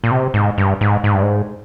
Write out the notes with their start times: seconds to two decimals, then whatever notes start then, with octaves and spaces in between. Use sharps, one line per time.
0.04 A#2
0.11 C3
0.34 G#2
0.58 G2
0.81 G#2
1.04 G#2
1.14 G2
1.23 G#2